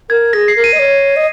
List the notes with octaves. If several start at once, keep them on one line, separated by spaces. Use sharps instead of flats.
A#4 G#6
G#4 A#6
C7
A#4
D#7
D#5
C#5
D#5